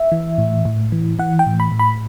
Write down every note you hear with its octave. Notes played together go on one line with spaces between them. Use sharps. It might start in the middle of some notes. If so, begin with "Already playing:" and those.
Already playing: E5
E3
A2
A2
E3
E3 F#5
G5
A2
B5
A2
B5